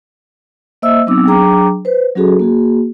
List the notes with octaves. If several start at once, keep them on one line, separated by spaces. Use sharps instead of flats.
A#3 C5 D#5 E5 E6
F#3 B3 C4 D#4 D6 E6
F#3 D4 G#4 G5 A#5 D6
B4 C5
F#3 C#4 F#4 G#4 A4
A#3 F#4 G#4